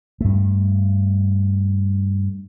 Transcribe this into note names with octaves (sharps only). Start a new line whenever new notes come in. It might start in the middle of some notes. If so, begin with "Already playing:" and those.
G2 A3